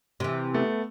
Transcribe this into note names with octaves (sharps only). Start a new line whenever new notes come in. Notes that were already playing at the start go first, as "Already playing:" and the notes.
C3 E3
A3 B3